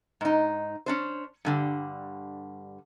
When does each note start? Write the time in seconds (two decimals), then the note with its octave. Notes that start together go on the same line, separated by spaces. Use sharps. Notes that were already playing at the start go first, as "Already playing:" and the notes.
0.21 G#2 D#4
0.86 C#4 D4 C5
1.45 G2 D3 G3